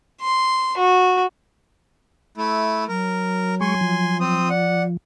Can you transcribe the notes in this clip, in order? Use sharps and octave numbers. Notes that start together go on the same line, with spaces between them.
C6
F#4
A3 E4
F#3 A#4
G#3 G#5 C6 C#6
F3
C4 C5 D#6
D5 F#5